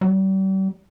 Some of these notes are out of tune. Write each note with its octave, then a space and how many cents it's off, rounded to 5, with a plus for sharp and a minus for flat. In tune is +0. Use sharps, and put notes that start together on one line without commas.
G3 -40